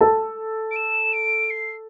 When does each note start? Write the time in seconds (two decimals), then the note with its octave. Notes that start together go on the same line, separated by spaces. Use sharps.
0.01 A4 A5
0.71 D7
0.76 E7
1.13 D7
1.50 C7